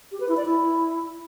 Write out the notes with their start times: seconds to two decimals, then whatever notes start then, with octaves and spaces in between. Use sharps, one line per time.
0.12 G4
0.20 B4
0.29 E4
0.37 D5
0.45 E4